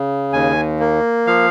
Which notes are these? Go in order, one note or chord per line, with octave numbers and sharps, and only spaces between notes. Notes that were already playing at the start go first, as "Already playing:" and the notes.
Already playing: C#3
D#2 G#5
A#3
F3 F5